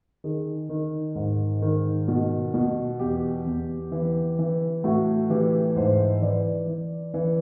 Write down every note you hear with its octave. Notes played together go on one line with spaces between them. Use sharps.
D#3 G#4
D#3
G#2
D#3
B2
B2
E2 G4
E2
E3
E3
A2 F#4
E3 G4
G#2 C5
E3 D5
E3
E3